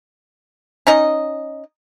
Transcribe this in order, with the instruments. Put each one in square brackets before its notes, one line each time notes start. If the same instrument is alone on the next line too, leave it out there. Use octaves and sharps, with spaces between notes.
[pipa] C#4 D#4 D#5